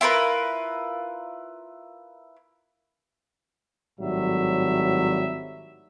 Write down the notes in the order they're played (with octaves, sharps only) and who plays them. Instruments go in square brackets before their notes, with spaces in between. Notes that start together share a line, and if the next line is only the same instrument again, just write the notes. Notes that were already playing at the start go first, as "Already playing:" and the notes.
[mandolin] E4 F4 A#4 B4
[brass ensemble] G#1 A2 F#3 G3 E5